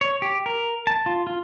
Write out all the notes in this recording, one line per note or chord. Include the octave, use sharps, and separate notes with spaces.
C#5
G4
A#4
A5
F4
F4